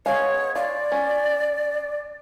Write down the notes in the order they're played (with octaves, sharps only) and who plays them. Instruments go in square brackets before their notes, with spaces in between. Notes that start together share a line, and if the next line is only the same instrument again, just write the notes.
[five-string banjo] G#3 B3 F5 [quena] C#5
[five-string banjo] F4 [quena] D5
[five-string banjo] C#4